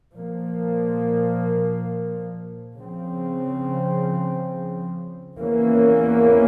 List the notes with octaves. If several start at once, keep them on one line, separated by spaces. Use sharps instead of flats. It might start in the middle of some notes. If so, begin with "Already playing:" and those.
A#2 F3 A#3
C#3 F3 C4
E2 E3 A#3 C#4